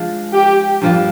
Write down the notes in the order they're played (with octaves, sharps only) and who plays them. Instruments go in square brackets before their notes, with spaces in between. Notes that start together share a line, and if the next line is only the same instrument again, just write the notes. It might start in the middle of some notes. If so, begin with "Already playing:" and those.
Already playing: [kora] F3 G#3 D4
[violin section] G4
[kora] G2 F3 A#3 D4